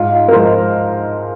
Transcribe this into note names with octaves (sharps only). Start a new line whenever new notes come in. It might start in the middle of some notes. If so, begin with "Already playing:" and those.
Already playing: G#2 F4
A#4
F3 G#3 C5